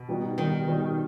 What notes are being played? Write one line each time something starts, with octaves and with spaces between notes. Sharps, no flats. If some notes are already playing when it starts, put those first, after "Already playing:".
Already playing: B2
G3 B3 D#4 F#4
D#3 G3 B3 D#4 F#4
G3 B3 D#4 F#4